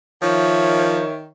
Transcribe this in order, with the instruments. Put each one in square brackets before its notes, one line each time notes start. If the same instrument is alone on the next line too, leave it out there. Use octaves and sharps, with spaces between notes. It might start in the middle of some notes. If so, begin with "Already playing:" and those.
[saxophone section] D#3 [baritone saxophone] F3 [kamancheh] C#5 E5